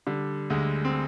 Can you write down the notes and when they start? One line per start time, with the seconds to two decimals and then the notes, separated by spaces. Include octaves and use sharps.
0.07 D3 G3
0.50 D2 G#3
0.85 C4